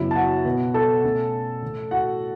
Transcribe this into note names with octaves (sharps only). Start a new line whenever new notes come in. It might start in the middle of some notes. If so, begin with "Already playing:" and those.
Already playing: F#2 C#3 F#3 B3 E4 E5
A5
F#4 F#5
B2 B3
A4 A5
B2 A3 C#4
A2 E3 A3
F#4 F#5